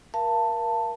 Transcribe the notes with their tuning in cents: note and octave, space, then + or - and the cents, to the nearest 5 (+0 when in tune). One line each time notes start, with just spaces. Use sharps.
A#4 +25 F5 -40 A5 +15